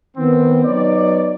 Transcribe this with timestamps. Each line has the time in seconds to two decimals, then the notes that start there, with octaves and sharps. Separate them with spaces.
0.17 D#3 B3 C4
0.64 F#3 B3 D#4 C#5 D5